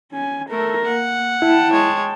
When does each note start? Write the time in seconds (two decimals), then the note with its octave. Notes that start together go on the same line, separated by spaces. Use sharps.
0.12 C#4 G#5
0.50 A3 A4 A#4
0.86 A#3 F#5
1.42 E4 G5 A5
1.72 G#3 C#5